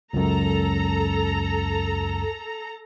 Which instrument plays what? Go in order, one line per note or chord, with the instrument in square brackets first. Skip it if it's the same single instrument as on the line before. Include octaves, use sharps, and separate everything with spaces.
[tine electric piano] C#2 F#2 [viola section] A4 A#5